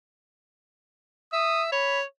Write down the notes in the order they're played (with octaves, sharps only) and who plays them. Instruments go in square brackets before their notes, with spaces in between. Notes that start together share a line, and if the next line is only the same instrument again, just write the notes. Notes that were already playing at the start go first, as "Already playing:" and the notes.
[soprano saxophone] E5 [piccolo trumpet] D#6
[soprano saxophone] C#5 [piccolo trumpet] B5